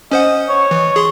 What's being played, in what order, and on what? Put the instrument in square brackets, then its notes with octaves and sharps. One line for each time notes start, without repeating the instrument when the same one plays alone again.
[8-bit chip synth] C#4 C5 F#5 [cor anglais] D#5
[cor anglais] C#5
[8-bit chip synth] E3
G#4 C6